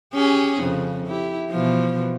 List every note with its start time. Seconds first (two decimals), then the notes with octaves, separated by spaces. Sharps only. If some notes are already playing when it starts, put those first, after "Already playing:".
0.14 C#4 G4 G#4
0.60 F2 C#3
1.07 E4 G4
1.51 B2 E3 F3